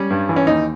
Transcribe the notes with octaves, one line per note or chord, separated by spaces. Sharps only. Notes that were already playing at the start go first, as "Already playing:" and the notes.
Already playing: G3 C#4
G2
E3
C#4
D#2 D#4